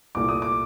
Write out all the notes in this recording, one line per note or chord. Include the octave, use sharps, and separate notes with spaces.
C2 A#2 A3 D6
D#6
D6